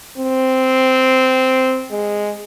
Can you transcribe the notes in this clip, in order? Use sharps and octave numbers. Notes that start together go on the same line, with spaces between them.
C4
G#3